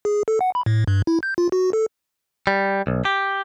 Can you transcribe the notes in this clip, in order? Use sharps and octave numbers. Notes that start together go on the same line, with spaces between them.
G#4
A4
F#5
B5
A2
G2
E4
G6
F4
F#4
A4
G3
B1
G4